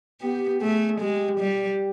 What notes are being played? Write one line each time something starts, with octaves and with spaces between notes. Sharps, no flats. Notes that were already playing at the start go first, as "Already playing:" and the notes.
B3 G4
A3 G#4
G#3 G4
G3